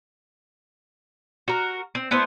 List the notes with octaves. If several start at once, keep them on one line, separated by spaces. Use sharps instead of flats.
F#4 A#4
C4
A3 B3 E4 C5